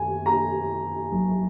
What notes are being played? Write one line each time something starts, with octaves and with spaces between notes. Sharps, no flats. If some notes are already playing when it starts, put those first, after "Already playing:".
Already playing: F#2 D#3 A#3 G#5
A#5
G#1 G#2 F#3 A#3 D#4